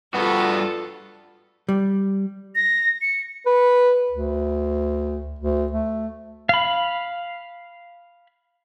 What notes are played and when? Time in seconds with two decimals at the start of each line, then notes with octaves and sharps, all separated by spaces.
0.14 G2 B3 F4 F#4 A4
1.69 G3
2.55 A#6
3.02 C#7
3.46 B4
4.11 D2
5.38 D2
5.72 A3
6.49 F5 B5